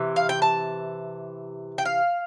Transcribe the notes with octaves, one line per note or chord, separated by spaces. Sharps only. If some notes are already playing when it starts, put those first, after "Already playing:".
Already playing: C3 E3
F5
G5
A5
G5
F5